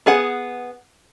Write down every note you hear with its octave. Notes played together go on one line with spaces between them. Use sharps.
B3 G#4 F#5